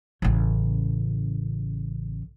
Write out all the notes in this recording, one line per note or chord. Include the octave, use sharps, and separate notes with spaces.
A1 C#3